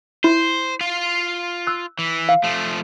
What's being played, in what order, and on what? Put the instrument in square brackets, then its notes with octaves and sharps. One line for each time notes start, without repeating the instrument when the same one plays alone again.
[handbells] E4 [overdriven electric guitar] C5
[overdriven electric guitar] F4 F5
[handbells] E6 F#6
[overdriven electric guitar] E3
[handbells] F5
[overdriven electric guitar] F3 A3